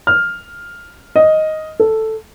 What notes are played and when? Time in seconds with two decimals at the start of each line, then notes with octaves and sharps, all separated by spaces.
0.07 F6
1.16 D#5
1.80 A4